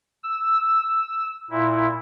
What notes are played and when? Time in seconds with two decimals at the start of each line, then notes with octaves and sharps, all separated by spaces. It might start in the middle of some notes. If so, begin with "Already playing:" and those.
0.23 E6
1.50 A#2 E4